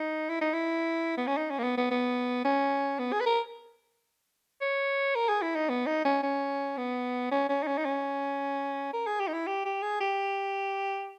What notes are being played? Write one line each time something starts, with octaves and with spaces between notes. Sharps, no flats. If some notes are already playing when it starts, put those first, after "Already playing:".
Already playing: D#4
E4
D#4
E4
B3
C#4
D#4
C#4
A#3
B3
B3
B3
C#4
B3
G#4
B4
A#4
C#5
A#4
G#4
E4
D#4
B3
D#4
C#4
C#4
B3
C#4
C#4
D#4
C#4
D#4
C#4
A#4
G#4
G4
D#4
E4
G4
G4
G#4
G4